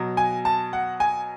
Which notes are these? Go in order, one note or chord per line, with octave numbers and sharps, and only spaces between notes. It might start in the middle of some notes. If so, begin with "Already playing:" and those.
Already playing: B2 F#3
G#5
A5
F#5
G#5